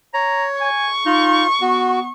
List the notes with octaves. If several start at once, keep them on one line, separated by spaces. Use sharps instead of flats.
C#5 A#5
G#5 C#6
D#4 F4
B3 F#4